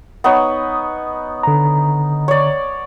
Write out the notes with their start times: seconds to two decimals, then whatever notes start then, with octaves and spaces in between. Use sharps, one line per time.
0.24 B3 D#4 C#5
1.43 D3 A#5
2.28 C#5 D5